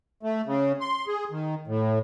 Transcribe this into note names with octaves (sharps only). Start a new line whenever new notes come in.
A3
C#3
C6
G#4
D#3
A2